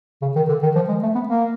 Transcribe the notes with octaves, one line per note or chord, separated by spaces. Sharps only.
C#3
D#3
D3
D#3
F3
G#3
A3
B3
A#3